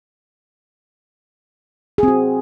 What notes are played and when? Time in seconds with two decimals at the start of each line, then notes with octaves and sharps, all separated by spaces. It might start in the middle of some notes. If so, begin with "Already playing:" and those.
1.98 G#4
2.03 C4
2.08 F#4